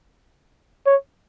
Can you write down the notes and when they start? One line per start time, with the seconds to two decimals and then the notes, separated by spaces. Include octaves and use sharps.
0.86 C#5